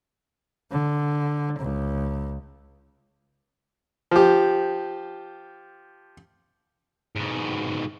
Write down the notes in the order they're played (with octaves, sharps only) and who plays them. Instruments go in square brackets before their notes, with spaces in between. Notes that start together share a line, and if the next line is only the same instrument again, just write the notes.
[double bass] D3
C#2
[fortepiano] F3 G4
[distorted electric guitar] G#2 B2